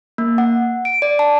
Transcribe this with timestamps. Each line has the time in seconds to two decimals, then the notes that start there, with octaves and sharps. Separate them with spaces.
0.18 A#3
0.38 F#5
0.85 D7
1.02 D5
1.19 A5